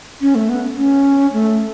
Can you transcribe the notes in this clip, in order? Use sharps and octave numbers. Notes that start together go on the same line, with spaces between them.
C#4
A3
B3
C#4
A3